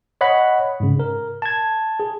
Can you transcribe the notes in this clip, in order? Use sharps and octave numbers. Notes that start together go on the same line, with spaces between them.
C#5 D#5 F#5 B5
G#2 C#3
A#4
A5 G#6
G#4